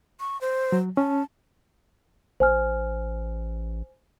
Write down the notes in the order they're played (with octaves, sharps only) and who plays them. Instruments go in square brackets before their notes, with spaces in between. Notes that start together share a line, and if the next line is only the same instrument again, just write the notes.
[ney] C#6
C5
[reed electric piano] F#3
[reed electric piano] C#4 [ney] A5
[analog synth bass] A1 [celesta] C5 G#5 F6